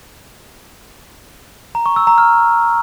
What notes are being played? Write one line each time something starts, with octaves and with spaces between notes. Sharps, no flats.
A#5
C#6
E6
A#5
F6